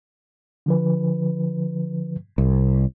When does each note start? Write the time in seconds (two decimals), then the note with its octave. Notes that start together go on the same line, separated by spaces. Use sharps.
0.66 D3 F3 B4
2.38 C2